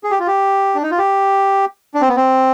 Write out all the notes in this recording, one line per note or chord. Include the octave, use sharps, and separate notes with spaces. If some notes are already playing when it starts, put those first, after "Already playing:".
G#4
G4
F4
G4
D4
D#4
F4
G4
D4
C4
B3
C4